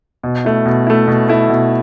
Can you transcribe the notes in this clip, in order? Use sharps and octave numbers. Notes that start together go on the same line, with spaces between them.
B2
A3 E4
B2
A3 E4
B2
A3 E4
B2